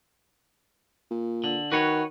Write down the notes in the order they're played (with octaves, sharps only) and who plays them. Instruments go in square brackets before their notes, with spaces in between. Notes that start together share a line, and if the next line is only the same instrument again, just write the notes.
[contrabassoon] A#2
[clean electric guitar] D3
[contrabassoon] D#3 [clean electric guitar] F#4 B4 C#5